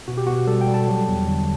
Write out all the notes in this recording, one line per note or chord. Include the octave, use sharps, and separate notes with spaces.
B2 F#4
G4
B2 F#4
G3 A4
G5
G3
A5
F#3
E2
D3